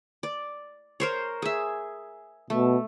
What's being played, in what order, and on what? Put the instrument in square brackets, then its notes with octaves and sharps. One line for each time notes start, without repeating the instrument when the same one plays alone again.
[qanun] D5
A#4 C5 C#5
G#4 E5
[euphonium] B2 [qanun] A3